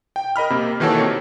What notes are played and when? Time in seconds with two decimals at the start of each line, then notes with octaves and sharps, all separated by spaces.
0.16 G5
0.36 A#4 D#5 B5 F6
0.50 C3 A#3
0.80 D#3 E3 A#3 F#4 A4 C#5
1.00 C3